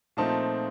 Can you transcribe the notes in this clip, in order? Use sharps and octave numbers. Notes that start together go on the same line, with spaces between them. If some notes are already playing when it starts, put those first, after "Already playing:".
A#2 F3 A3 C4 D#4 A5